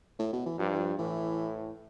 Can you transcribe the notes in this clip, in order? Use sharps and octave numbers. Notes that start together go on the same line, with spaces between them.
A2
B2
E3
G2 F3
E3
F3
A2 E3